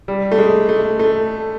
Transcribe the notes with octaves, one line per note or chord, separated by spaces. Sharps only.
G3
A3
G#3
A3
A3